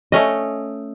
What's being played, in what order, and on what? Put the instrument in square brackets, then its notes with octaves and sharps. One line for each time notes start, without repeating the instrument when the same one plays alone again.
[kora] A3 C#4 D#5